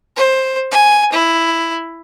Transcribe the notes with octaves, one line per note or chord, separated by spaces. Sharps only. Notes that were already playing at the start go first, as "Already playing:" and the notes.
C5
G#5
E4